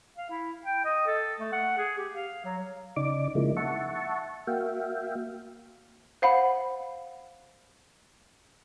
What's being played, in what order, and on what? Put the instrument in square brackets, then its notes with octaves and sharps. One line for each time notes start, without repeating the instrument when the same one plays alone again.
[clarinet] F5
E4
G5
D#5
A4
A3
F#5
G#4
G4
F5
F#3
[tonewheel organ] C#3 D#4 D5 D6
C#3 F3 G#3 A#3 D#4 E4
E5 F#5 A5 C#6
A#3 F#4 E5 F5 G5
[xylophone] C5 F5 F#5 B5